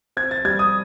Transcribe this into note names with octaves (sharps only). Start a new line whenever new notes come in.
C4 G#6
A6
G3 G#6
D#6